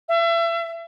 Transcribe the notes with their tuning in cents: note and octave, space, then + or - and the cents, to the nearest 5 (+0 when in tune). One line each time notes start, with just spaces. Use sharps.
E5 +35